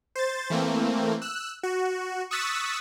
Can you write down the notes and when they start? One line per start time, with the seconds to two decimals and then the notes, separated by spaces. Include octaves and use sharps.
0.16 C5 A6
0.50 E3 A3 A#3 C4
1.22 E6 F#6
1.63 F#4
2.31 C#6 D#6 E6 F#6 A6 B6